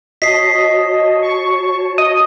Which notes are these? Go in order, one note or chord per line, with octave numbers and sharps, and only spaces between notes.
F#4 C#5 D#5 A5 B6 C7
C#6
D#5 D#6